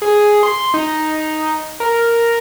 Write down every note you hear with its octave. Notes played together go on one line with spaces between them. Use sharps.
G#4
C6
D#4
A#4